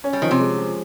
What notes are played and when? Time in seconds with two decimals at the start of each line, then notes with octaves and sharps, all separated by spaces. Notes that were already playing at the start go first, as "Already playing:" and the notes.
0.04 C#4
0.13 G3
0.22 D#3 F3
0.31 C3
0.40 G#3
0.58 F3